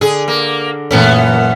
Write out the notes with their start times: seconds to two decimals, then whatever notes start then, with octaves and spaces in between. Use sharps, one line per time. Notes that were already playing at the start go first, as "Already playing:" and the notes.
0.01 D3 G#4
0.28 A#3
0.91 F#2 A#2 E3 A3 B3 C#4